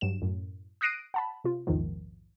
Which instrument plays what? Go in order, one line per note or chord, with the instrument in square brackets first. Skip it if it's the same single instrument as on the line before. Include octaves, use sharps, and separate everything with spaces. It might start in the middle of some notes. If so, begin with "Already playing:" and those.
[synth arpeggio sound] G2 F#3 E7
F#2 A2
D#6 F#6 A#6 C7 D7 D#7
F#5 A5 B5
C3 F4
A#1 E2 G#2 D#3 F3